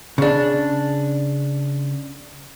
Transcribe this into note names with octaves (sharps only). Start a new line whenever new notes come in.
C#3 D4